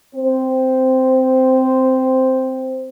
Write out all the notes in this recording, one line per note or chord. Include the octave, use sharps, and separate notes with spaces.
C4 C5